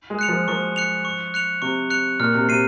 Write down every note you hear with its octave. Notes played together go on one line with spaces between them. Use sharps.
G#3
F#6 C#7 F7
F3
F3 C#6
F#6 C#7 F7
C#6
F#6 C#7 F7
C3 C#6
F#6 C#7 F7
A#2 F6
C3
C3 C7 D#7